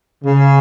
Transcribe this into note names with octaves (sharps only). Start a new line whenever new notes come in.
C#3